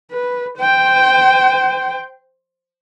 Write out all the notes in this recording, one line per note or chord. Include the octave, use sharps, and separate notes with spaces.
B4
C5 G5